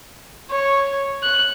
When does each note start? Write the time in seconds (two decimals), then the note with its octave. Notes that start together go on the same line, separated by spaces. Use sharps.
0.50 C#5
1.23 F#6